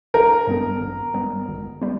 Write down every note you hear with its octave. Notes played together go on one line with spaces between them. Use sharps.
G#1 A#4
G2 G3 B3
G#1
G2 G3 B3
G#1
G3 B3